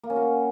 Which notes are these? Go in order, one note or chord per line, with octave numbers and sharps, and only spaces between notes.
A#3
C#4
F#4